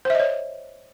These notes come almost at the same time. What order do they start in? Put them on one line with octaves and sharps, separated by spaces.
C5 E5 D#5 C#5